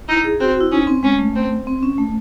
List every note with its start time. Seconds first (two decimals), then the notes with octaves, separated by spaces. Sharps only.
0.08 D#4 E4
0.24 G#4
0.40 C4 F#4
0.51 F#4
0.61 E4
0.72 C#4 D#4
0.87 C4
1.03 G#3 C#4
1.19 A3
1.35 C4
1.67 C4
1.83 C#4
1.98 A3